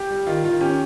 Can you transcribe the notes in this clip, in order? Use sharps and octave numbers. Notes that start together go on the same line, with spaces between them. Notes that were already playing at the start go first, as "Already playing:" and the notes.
Already playing: G4
G3
D#3 F4
D#3 F4
C#4 G4